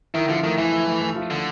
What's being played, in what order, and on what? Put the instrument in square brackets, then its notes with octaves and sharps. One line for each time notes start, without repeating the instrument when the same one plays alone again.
[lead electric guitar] D#3 [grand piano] E4
[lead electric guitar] D3 [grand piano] F3
[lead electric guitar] D#3 [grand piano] A3
[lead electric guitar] E3 [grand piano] E4
[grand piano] A3
A3
A3
F3
[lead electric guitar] D3 [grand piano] A3